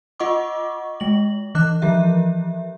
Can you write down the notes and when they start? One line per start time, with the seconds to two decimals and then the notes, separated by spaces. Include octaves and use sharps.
0.20 F4 D#5 F#5 C#6 D6
1.00 G#3 F#7
1.55 E3 D6 F#6
1.82 E3 F3 G4 E5